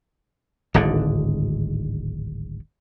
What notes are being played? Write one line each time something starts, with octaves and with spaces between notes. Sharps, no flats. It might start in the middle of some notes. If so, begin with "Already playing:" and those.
D1 G#1 G#2 D3